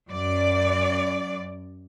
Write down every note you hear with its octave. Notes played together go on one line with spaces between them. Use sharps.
F#2 D5